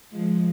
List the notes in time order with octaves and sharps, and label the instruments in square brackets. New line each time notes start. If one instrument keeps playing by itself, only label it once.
[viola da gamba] F3 G#3